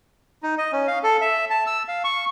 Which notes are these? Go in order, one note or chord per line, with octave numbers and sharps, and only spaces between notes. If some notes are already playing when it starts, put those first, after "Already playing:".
D#4
D#5
C#4
F5
A4
E5
A5
E6
F5
C#6